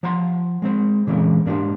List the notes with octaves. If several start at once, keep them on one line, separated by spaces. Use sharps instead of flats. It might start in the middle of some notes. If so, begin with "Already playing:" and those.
F3 C5 F#5 A#5 C6
G#3 C4 C5
A#2 C#3 E3 G#3 C4 A#4
G#2 A#3 D4 F4 G4 C5